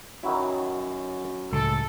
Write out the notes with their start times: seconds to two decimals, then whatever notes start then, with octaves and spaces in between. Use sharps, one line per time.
0.23 F#2 D#3 F#3 E4
1.52 C#2 A2 C#3 A4